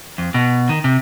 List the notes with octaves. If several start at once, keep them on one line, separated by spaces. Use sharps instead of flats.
F2
B2
D#3
C3